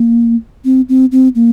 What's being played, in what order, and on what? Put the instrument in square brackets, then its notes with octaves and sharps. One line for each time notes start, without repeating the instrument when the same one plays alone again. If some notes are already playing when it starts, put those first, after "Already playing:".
Already playing: [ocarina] A#3
C4
C4
C4
A#3